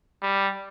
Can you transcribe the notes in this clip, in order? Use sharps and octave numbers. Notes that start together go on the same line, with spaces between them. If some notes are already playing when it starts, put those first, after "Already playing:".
G3